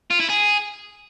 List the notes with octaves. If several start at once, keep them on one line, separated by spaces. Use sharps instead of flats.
F4
E4
G#4